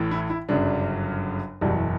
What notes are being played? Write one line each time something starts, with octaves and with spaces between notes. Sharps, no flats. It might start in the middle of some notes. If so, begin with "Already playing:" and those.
Already playing: A1 A2 E3
E4
E4
G1 F#2 C#3 F#3 D4
F#1 E2 B2 F#3 G3